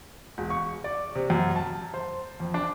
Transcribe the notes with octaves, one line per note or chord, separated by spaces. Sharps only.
E1
C#6
D5
C3
F#2
A5
C5
F2
D4